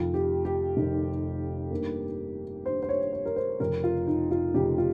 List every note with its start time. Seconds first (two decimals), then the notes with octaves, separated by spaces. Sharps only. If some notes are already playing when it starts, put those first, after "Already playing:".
Already playing: F1 F2 D#3 F4
0.14 G4
0.45 G4
0.77 F1 F2 D#3
1.71 G2 D#3 A#3
2.65 G2 D#3 A#3 C5
2.83 C5
2.89 C#5
3.13 C#5
3.25 A#4
3.36 C5
3.60 F1 F2 C#3 A#4
3.84 F4
4.07 D#4
4.31 F4
4.54 F1 F2 C#3 G4
4.78 F4